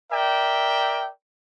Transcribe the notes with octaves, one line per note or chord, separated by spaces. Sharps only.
A#4 D5 E5 G5